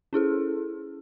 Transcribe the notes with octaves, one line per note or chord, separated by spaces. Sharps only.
C#4 E4 G#4 A4